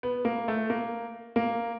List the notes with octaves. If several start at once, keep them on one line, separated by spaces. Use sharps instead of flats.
B3
A#3
A3
A#3
A#3